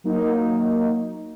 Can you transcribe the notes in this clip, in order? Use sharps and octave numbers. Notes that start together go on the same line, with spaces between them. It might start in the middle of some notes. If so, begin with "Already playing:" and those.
F#3 A#3 D#4